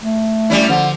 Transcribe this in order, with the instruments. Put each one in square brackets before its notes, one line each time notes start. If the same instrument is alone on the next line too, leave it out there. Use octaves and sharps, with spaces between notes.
[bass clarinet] A3
[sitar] G3 C#4 E4
[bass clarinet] D3 [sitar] F3